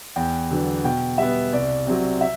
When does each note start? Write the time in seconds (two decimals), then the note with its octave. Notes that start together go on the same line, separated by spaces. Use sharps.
0.16 E2 G5
0.51 D3 F#3 B3
0.84 B2 G5
1.18 G3 B3 E5
1.53 C2 D5
1.87 C3 F#3
2.21 E5